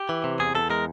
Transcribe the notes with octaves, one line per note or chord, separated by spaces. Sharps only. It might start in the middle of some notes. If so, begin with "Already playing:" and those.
Already playing: G4
E3
C3
E2 G#4
E2 A4
G#3 A#4